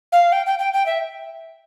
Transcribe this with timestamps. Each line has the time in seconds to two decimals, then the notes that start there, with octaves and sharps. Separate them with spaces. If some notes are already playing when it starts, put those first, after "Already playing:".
0.12 F5
0.32 G5
0.46 G5
0.59 G5
0.73 G5
0.86 E5